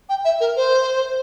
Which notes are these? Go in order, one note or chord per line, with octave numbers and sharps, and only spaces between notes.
G5
E5
A#4
C5